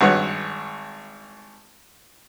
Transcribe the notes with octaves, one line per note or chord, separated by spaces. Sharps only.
G#1 G2 F#4 B4 C#5